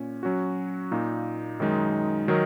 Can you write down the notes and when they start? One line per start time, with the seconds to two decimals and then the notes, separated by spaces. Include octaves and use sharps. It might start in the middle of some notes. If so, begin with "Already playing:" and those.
Already playing: A#2 C#4
0.23 F#3 C#4 F#4
0.91 A#2 A#3 D#4
1.60 F#2 D#3 G#3 D#4
2.28 D#3 F#3 D#4 A#4 D#5